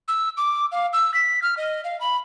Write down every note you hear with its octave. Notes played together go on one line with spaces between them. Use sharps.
E6
D6
F5
E6
B6
F6
D#5
F5
B5